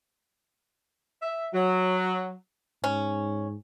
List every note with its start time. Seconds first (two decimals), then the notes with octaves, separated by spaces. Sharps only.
1.22 E5
1.53 F#3
2.84 G#2 C#4